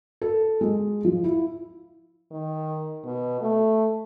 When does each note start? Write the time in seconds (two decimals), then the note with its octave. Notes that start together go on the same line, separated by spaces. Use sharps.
0.22 A4
0.61 G#3
1.05 F3
1.24 E4
2.32 D#3
3.04 B2
3.41 A3